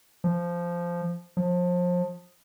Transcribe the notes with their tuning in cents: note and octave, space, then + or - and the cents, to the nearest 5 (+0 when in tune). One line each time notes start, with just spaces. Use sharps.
F3 -10
F3 +30